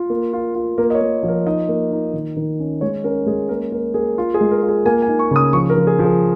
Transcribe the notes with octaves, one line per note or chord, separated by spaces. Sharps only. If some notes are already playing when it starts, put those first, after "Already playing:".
Already playing: F4
A#3
F4
F4
A#3 A#4
D#5
C#5
A#3
F3
A#4
D#4 D#5
A#3
D#4
D#3
D#3
C#4
G#3 C#5
C#4 A#4
G#3 G#4
A#3 A#4
A#3 A#4
A#3 G#4
F4
G#4
G#3
A#4
F4
G#4
A#3 G#5
G#5
D#4
C#6
C#3 D#6
F3 C#6
A#4
F3
G#4
F3
G#4